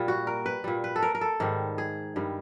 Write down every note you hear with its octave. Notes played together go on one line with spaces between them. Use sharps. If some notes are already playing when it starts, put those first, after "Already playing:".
Already playing: A#2 G3
F#4
A#4
B4
A#2 G3
B4
A4
A#4
A#4
A4
G#2 D#3 G3
G#4
G2 D#3 G3